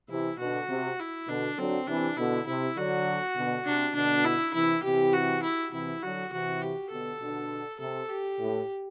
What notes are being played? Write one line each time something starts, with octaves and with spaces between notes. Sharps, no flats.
C3 E3 E4
B2 D3 F#4
C3
E4
B2 D3 D4
D3 F#3 C4
C3 E3 D4
B2 D3 E4
C3 E4
D3 F#3 F#4
B2 D3
C3 D4
B2 D3 D4
E4
C3 E3 E4
C3 E3 G4
F#4
E4
C3 E3 E4
D3 F#3 F#4
C3 E3 F#4
G4
B2 D3 A4
B2 D3
C3 A4
G4
A2